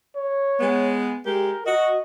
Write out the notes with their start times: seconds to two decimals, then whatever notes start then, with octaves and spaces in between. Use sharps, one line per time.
0.16 C#5
0.60 G#3 B3
1.26 G#3 G4 A#4
1.66 F#4 D#5